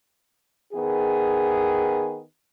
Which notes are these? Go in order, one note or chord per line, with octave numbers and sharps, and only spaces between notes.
D#3 B3 G#4